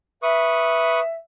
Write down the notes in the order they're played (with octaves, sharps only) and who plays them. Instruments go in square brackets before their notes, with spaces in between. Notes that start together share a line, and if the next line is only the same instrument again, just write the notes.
[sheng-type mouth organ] B4 C#6 D#6 [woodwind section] E5